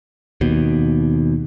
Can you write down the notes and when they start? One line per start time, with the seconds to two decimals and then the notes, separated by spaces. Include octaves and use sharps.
0.41 D#2 B2